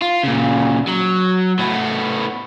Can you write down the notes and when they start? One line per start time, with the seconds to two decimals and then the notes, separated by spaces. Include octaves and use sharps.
0.02 F4
0.23 A#2 C#3
0.88 F#3
1.59 A2 B3